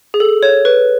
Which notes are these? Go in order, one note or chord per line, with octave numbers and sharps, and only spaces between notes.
G#4
A4
C#5
B4